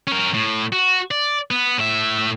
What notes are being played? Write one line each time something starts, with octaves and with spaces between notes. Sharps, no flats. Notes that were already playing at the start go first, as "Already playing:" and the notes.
C#4 A#4
A2
F#4
D5
B3
A2 E5